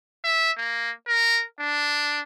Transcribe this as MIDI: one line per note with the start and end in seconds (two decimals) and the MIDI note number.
0.24 0.52 76
0.57 0.91 58
1.07 1.43 70
1.60 2.21 62